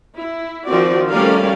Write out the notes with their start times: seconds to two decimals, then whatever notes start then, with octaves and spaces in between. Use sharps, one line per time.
0.19 E4
0.67 D#3 F3 C4 F#4 D5
1.11 G3 A3 C#4 A#4 D5 F5